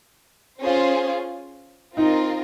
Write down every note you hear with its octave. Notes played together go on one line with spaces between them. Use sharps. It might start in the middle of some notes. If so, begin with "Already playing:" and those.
C#4 F4 G#4 C5
C4 D#4 F4 A#4 D#5